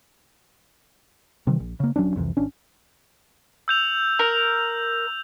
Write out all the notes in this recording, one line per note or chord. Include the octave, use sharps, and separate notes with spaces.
C3 D#3 E3 G3
A#1
C#3 A#3
D#1 F#3 C#4 D4
C2 F2 C3 E3
G#1 C#4 D4
E6 G6 F7
A#4